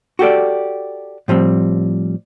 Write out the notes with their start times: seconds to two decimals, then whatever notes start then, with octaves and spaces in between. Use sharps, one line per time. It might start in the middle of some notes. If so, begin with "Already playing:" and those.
0.19 F#4 G4 A4 D5
1.28 A2 F3 G3 C4